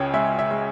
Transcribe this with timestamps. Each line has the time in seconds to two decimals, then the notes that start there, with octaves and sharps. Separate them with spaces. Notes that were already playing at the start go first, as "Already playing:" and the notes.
Already playing: C#2 C#3 C#5 G5
0.14 G#3 E5
0.39 E5
0.51 G#3